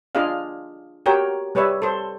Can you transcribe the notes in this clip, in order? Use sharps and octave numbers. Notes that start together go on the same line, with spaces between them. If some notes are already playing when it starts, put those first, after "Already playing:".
D4 F4 G#4 D#5 F5
F#4 G4 A#4 C#5 G5
G3 B4 C#5 D5 E5
A4 C5